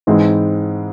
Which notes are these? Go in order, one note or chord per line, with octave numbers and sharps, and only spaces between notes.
G#2 E3 G#3 C4 E4